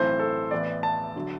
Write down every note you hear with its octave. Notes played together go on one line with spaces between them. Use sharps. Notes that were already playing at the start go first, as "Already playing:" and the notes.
Already playing: B1 A2 E3 A3 C4 C5
A4
A1 A2 E3 B3 D5
A5
D3 F#3